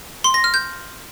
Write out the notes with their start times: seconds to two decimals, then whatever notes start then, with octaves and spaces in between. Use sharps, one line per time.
0.24 C6
0.34 A#6
0.44 F6
0.54 G6